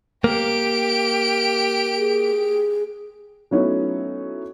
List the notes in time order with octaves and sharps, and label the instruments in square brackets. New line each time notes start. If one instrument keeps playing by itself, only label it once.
[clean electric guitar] A#3 [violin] G4 D7
[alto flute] G#4
[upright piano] F#3 A3 B3 C#4 D#4 E4